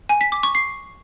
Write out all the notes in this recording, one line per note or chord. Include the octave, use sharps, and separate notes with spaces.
G#5
B6
D6
C#6
C7